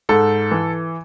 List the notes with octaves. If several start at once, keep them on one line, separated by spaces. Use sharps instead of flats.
G#2 A4
E3